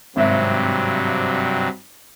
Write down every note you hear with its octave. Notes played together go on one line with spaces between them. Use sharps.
G#1 G2 C3 F#3 E5